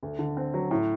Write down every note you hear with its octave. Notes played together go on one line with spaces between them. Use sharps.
D2
D3
C4
F#3
A2